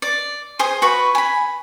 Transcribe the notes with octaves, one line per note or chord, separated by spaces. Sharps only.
D5
G#4 C5 D#6
F#4 B4 C#6
G#5 B5